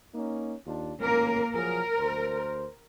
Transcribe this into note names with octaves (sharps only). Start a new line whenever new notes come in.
A#3 C#4 D#4
D#2 D4 F4
G#1 A2 A#3 C#4 A#4
F3 F#3 G#4 A#4
D2 C5